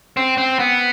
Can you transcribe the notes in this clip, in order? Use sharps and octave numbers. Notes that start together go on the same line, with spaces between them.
C4
C4
B3